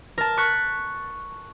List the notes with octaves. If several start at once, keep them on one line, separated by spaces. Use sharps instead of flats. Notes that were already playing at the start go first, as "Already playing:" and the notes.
A#4 A5
C#6 F#6 B6